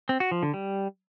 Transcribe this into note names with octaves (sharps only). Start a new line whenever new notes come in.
C4
F#4
F3
D3
G3